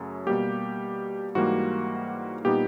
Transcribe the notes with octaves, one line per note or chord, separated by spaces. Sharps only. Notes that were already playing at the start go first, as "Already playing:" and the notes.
Already playing: F#2 C#3 F#3 A3
B2 G3 A#3 G4
G#2 E3 G3 A#3 F#4
A#2 G3 B3 D#4 G4